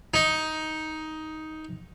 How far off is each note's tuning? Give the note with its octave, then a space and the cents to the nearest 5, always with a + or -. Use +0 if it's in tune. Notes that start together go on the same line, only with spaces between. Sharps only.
D#4 +10